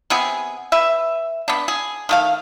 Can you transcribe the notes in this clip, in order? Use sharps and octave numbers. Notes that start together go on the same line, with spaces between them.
C3 B3 G#4
B4 E5
B3 D4
G#4
D#3 A3 F5